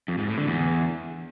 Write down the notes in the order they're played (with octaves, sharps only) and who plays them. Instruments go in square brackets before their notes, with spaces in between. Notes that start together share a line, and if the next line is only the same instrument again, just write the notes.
[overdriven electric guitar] F2
G#2
A2
D3
E2